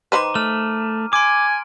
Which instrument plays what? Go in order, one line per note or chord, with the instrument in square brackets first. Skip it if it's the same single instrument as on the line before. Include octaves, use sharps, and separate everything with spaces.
[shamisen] D#3 B4 C5 [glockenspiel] A#5 D6 D#7
[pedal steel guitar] A3 [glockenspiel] F6
[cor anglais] G#5 [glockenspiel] C6 D7 [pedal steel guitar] D6